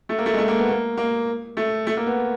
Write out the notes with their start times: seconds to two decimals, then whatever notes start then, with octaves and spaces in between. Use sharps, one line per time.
0.09 A3
0.18 A#3
0.26 A3
0.34 G#3
0.38 A3
0.48 A#3
0.58 B3
0.69 A#3
0.97 A#3
1.57 A3
1.87 A3
1.97 A#3
2.06 B3